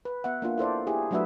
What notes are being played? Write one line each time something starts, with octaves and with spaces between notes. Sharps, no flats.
B4
B3 E5 F#5
A#3 D4 F4
E4 A4 C5 D5
E4 G4 G#4
F#3 A3 D4 F#4 B4 E5